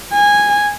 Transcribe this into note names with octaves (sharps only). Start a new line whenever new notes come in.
G#5